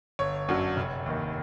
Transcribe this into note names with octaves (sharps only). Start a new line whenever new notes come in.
G1 C#5
F#2 D3 F#3
F1
D#2 D#3